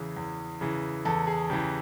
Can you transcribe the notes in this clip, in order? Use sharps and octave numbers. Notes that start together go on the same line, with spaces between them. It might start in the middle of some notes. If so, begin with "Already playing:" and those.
Already playing: E2 C#3 E3
E2
C#3 E3
E2 A4
G#4
C#3 E3 G4